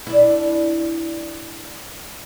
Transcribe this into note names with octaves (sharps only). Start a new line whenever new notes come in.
D4 E4